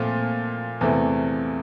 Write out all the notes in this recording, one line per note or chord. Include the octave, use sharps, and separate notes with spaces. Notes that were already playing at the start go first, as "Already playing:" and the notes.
Already playing: A#2 F3 A3 C4 F4
E2 C3 E3 A3